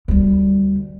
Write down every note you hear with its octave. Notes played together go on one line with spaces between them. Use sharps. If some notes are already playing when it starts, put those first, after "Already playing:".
D2 G3